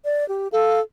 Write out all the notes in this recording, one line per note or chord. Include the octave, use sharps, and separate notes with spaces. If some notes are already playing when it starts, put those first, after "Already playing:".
D5
G4
A4 F5